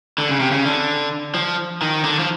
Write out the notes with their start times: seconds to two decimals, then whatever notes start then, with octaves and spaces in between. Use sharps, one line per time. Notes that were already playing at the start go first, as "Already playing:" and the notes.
0.18 D3
0.29 C#3
0.40 C3
0.51 C#3
0.65 D3
1.34 F3
1.82 D#3
2.04 D3
2.19 F3